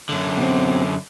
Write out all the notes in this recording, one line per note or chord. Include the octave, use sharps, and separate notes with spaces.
F#2 D3
B2 C4